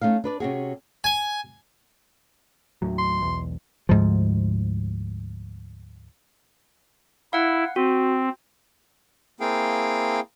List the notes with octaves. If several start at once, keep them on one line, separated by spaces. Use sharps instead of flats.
A3 C#4 D#4 F5
D4 B4 D5
C3 C#4 F#4 G#4
G#5
D#2 A2 F#3
C6
B1 E2
D2 G#2 F3
E4 F5 F#5
C4 F#4
A#3 C4 E4 G#4 F5 G5